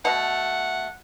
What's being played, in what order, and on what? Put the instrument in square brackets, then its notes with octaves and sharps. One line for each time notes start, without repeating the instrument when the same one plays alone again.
[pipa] B2 A3 [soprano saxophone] F#5